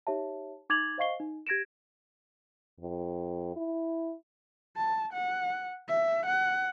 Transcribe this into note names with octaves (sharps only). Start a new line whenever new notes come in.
D#4 G4 C#5 E5 A5
D#4 D6 G#6 A6 F7 F#7
C5 D#5 F5 C#6 C7 G7
D#4
G4 G#6 A#6 D7 E7
F2
E4
A5
F#5
E5
F#5